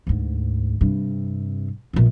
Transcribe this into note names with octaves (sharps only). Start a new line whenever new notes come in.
D2 G#2
G2 C3
A#1 B3